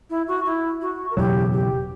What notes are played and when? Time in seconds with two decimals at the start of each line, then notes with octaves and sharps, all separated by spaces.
0.10 E4
0.28 F#4
0.46 E4
0.81 F#4
1.11 A#4
1.17 F#1 E2 B2 F#3 G4
1.53 G4